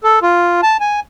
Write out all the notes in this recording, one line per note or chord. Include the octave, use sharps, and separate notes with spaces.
A4
F4
A5
G#5